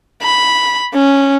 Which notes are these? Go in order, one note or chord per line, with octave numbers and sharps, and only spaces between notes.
B5
C#4